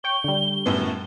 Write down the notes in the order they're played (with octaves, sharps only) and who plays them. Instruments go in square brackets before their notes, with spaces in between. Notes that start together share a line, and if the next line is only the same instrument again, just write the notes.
[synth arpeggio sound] C#5 G5 C#6 [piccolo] G7
[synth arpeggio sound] D3 G3
[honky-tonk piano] F#2 A2 B3